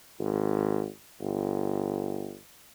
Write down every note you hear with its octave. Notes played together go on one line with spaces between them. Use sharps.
G#1
G1